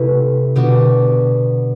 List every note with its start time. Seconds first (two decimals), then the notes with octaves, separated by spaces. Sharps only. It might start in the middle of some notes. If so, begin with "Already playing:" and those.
Already playing: C3 A3 E4 G4 B4
0.56 B2 D3 G3 B3 D4 F#4